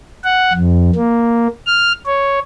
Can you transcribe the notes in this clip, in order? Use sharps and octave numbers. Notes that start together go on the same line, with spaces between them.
F#5
F2
A#3
F6
C#5